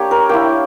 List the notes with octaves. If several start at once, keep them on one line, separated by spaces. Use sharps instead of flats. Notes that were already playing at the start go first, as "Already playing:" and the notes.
Already playing: A#3 D4 G4 C#5
A#4
A#3 E4 G5